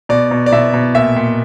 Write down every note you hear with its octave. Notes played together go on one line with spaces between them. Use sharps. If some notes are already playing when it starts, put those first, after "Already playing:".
B2 D5
B2
D5
B2 E5
B2
A#2 E5
A#2